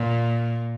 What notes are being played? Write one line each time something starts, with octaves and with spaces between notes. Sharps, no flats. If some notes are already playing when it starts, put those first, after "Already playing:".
Already playing: A#2